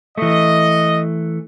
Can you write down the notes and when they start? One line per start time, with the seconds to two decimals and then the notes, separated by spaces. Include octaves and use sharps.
0.18 E3 A3 D#5